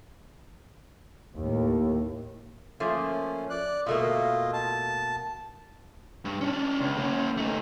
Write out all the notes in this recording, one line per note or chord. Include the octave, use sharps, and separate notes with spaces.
D#2 A2
F3 A3 A#3 C#4
D5 F#6
B2 A3 A#3 F4 D#5
A5
G2
C#4 D4
C#2
A#3 C#4
A3 D#4